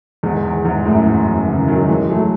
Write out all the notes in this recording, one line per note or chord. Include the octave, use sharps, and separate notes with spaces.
E2 G#2
E2
E2 G#2
F#2 A2
E2 G#2
F#2
C#3 E3
D#3 F#3
E3 G#3
F#3 A3